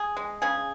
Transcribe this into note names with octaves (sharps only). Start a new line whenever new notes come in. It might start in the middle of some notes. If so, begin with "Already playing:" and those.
Already playing: G#4
G#3
C#3 G#4